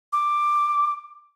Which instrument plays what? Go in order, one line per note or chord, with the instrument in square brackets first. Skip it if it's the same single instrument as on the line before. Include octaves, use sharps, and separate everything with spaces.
[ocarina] D6